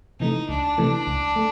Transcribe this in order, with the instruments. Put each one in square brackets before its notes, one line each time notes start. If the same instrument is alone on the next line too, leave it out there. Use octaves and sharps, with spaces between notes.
[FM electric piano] C3 E3 A3 [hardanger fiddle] D#4
[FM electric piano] C#2 [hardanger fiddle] D4
[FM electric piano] C3 E3 A3
C#2
A3